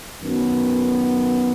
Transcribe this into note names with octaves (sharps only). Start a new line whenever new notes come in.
F#2 D#3 F#3 B3